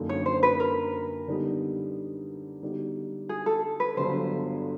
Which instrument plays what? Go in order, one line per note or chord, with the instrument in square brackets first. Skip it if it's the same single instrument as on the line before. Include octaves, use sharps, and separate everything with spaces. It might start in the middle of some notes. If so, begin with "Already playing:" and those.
Already playing: [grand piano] F#2 D3 F#3 A#3 D#4
[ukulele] C#5
C5
B4
A#4
[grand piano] D3 G3 B3 D#4
D3 G3 B3 D#4 F#4
[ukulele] G#4
A4
B4
[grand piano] G1 G2 D3 F#3 [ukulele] C5